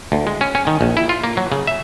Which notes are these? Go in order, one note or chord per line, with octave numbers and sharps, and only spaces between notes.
D2
G#3
C#4
C#4
D#3
A#1
E4
F4
A#3
F#3
C#3
E5